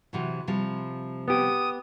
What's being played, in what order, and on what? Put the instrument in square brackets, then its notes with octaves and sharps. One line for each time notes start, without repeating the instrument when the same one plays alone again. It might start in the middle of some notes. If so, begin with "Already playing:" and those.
[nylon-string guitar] C3 E3 F#3
C3 F3 G3
[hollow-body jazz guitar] B3 G4 [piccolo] D#6